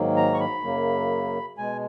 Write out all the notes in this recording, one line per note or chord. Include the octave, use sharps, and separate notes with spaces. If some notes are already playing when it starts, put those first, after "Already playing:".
Already playing: G#2 D#3 F#3 A#3
A#5
C#6
B5
F#2 C#3 F#3 A#3
B2 G#3 G#5